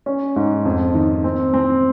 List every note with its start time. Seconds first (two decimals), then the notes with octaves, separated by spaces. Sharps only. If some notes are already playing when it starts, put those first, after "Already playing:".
0.06 C#4
0.36 G#2
0.65 F2
0.95 D#3
1.24 C4
1.53 C4